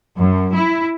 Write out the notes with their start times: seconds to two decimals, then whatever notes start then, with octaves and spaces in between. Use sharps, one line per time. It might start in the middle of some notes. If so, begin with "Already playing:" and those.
0.18 F#2
0.54 E4